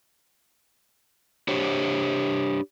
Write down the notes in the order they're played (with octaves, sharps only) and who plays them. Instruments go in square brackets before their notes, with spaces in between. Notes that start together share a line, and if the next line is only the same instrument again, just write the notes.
[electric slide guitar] D4 G4 C5 C#5